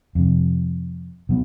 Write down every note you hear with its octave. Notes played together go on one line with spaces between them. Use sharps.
F2 C3
B2 F#3 B3